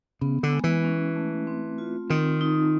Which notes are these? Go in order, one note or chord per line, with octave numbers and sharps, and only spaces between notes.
C#3 B3
D3
G#3
E3
C#4
A3
C4
F4
D#3 C4
D#4